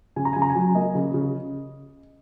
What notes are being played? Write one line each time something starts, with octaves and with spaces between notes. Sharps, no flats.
C#3 G#5
A#5
C#3 G#5
A#5
G#5
F#3
A#3 D#5
C#3
C#3